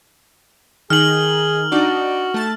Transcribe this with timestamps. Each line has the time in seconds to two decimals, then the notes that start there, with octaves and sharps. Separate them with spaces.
0.90 D#3 D#4 G#4 F6 F#7
1.72 D4 D#4 F#4 D5
2.34 A3 A5 A6